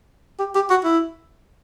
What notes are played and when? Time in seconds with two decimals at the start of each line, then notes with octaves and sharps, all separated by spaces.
0.39 G4
0.55 G4
0.70 F#4
0.84 E4